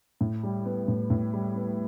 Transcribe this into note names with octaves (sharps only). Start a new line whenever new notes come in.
A2
G3
B3
A2
A2
G3
B3